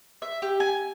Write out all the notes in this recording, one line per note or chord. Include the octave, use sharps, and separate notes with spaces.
E5
G4
G#5